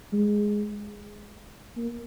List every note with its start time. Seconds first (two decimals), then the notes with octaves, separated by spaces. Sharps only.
0.13 G#3
1.77 A#3